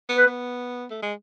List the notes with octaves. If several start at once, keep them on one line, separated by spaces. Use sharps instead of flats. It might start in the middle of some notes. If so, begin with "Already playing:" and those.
B3
B4
B3
A3
G#3